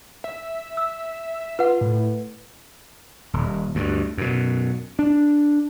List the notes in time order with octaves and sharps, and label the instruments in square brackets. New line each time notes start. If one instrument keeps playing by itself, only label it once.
[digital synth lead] E5
[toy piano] E6
[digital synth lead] F4 [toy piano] B4 F#5
[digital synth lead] A2
[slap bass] D#1
D2 G2
F#2 B2
D4